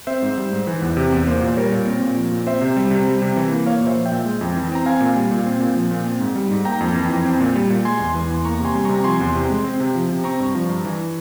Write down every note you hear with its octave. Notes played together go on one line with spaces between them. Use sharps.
C4 C5 E5
G#2
G3
G#2
E3
E2
C3
E2
A#3 C5
A#2 C5
G3 A#4 C#5
A#2
C4
A#2
F3
A#2
C4 C5 E5
C3
G3
C3
G3
C3
E3
A#3
A#3 C#5 F5
A#2
C5 E5
F3
E5 G5
A#2
G#3
F2
E3
C4 A#5
C4 F5 G#5
A#2
G3
A#2
C4
A#2
F3
A#2
C4
G#2
G3
G#2
A#3 G5 A#5
F2
E3
F2
C4
A#2
G3
A#2
G#3 G#5 C6
E2
E3 G#5 C6
E2
A#3 A#5 C#6
C3 G#5 C6
G3
C3 A#5 C#6
F3 G#5 C6
E2
C3
G#3
C4
C3
F3
C3
C4 A#5 C#6
G2
F3
G2
E3